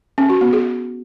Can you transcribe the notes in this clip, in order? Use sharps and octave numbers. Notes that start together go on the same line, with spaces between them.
C#4
F#4
B3
G#4